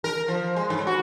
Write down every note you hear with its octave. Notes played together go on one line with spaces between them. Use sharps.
A#4
F3
G#3
G#2
F#4